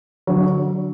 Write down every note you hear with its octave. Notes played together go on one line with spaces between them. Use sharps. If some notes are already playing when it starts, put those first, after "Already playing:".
D3 F#3